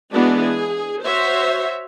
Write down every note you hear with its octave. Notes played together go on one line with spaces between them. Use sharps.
E3 G#3 B3 D4 F#4
G#4
F#4 C5 C#5 E5